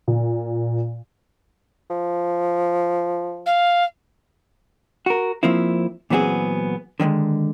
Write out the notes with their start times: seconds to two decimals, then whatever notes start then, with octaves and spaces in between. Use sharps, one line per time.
0.08 A#2
1.90 F3
3.46 F5
5.06 F#4 A#4
5.43 F3 A#3 C4 E4
6.10 A#2 E3 F#3 B3 C4 G#4
7.00 D3 D#3 F#3 G#3